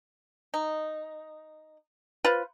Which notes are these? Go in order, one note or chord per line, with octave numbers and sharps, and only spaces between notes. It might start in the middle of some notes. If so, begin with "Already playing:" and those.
D#4
F4 B4 C5